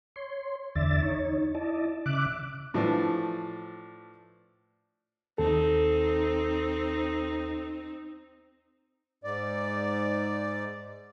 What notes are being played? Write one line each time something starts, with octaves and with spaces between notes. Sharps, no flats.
C#5 C6
E2 D3 D5 E5 A6
D#4 C#5
E4 D5 D#5 A5
C#3 E5 D6 F#6
A2 E3 F3 D4
D#2 C4 D#4 A4
G#2 D5